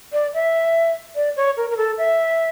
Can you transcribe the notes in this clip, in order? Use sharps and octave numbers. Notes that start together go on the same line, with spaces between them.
D5
E5
D5
C#5
A#4
A#4
A4
E5